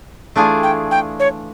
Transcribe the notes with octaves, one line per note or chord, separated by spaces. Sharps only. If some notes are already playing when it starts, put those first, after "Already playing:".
E3 A3 D4 F4 G#4
G5
G5
C#5